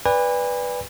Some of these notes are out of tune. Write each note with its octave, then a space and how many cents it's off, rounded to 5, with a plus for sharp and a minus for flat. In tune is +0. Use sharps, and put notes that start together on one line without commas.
B4 +0 D5 +0 G#5 -40